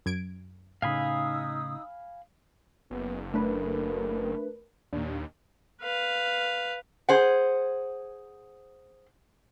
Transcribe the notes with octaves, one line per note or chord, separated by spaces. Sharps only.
F#2 G#6 D7
A2 C#3 D#4 F5 G#5 B5 D#6 E6
F#1 B3
A3 D4 A#4 B4
D#2 A#2 D4
B4 F5
G#4 C5 F#5